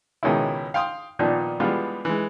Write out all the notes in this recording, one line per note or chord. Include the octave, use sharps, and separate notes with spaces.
C#2 B2 D#3 G#3 C#4 E4
F5 G5 C6 D#6
A#2 D#3 F3 B3 D4 D#4
E3 G3 G#3 B3 D4 F4
E3 G#3